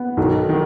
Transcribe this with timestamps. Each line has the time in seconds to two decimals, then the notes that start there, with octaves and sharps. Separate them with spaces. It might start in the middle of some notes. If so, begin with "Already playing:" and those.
Already playing: B3
0.17 B1 D#3
0.49 D#3